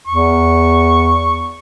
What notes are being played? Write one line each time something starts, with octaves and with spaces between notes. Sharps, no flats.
E2 C#6